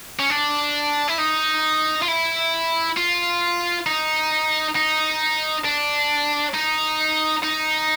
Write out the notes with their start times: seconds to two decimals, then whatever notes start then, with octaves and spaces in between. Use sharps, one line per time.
0.19 C#4
0.30 D4
1.08 E4
1.19 D#4
2.02 F4
2.08 E4
2.97 F4
3.86 D#4
4.76 D#4
5.65 D4
6.54 D#4
7.43 D#4